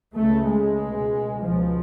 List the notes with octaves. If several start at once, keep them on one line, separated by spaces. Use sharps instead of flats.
C#2 C#3 A3
G#3
C#2 B2
C#2 B2 F3